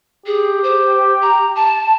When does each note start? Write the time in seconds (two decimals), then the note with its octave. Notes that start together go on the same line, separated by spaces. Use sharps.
0.26 G4 G#4
0.64 C5
1.22 A#5
1.56 A5